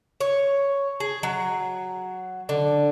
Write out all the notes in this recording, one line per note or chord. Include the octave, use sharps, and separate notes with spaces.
C#5
G#4
F#3
D3